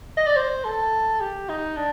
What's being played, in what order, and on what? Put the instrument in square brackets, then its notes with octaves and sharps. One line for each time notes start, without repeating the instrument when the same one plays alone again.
[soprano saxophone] D#5
D5
C5
A4
G4
D#4
D4